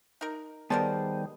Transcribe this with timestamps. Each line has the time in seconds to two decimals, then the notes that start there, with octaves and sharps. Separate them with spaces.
0.21 D#4 A#4
0.70 D#3 G3 B3 G#4 A#4 C5 D5 A5